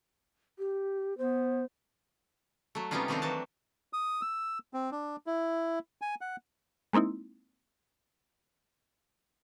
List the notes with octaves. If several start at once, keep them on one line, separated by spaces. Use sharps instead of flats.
G4
B3 C5
F#3 A3
C3 G3 B3 C#4 D#4 F4
D#3 F3 A3 C4 D4 D#4
E3 F#3 F#4 A5
D#6
E6
C4
D4
E4
G#5
F#5
G#3 A#3 C4 D#4 E4